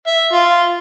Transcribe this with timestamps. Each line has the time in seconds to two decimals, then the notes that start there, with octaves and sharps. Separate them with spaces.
0.07 E5
0.33 F4